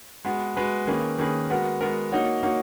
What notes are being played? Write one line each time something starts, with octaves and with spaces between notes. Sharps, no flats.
G#3 B3 F#4 B4
G#3 B3 F#4 B4
D#3 A#3 C#4 G#4 B4
D#3 A#3 C#4 G#4 B4
G#3 B3 F#4 A#4
G#3 B3 F#4 A#4
A#3 D#4 F#4 C#5
A#3 D#4 F#4 C#5